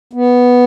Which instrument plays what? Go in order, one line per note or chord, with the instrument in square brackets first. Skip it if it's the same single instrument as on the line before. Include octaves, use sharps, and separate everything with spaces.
[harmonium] B3